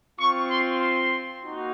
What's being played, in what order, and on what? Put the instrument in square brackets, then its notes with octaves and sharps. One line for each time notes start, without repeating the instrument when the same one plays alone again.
[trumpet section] C4 F4 C#6
C6
C6
A#3 D#4 F#4